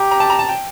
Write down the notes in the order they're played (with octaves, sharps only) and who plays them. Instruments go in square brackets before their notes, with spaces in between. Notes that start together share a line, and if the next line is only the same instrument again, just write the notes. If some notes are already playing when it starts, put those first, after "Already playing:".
Already playing: [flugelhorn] G4 [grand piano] A#5
[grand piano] A#5
A5
A#5
A5
G5